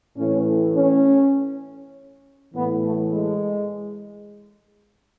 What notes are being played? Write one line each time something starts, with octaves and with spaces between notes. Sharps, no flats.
A2 E3 C#4
C#4
A2 E3 B3
A3
G#3